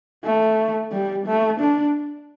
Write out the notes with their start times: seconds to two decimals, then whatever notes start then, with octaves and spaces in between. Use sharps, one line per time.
0.24 A3
0.92 G3
1.26 A3
1.60 D4